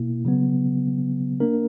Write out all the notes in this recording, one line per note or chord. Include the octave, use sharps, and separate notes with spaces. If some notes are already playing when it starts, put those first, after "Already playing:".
Already playing: B2 A#3 E4
C#3 F#3 B3
A#3 D4 A#4